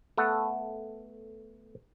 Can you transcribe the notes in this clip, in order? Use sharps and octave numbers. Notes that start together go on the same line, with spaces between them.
A3 B3 A4 F#5